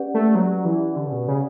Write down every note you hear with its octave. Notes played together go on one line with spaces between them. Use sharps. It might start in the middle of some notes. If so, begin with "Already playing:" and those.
Already playing: C#4 G4 B4 D5 F#5
A3
F#3
E3
D3
C#3
B2
C#3